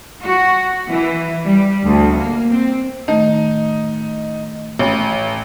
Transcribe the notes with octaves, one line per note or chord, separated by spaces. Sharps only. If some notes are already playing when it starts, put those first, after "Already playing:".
F#4
E3
G3
D2
A#3
C4
A2 D#3 A3 D#4
A1